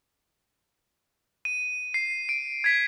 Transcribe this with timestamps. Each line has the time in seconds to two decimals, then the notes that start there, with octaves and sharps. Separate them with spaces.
1.45 D#7
1.94 C7
2.29 D7
2.64 G#6 B6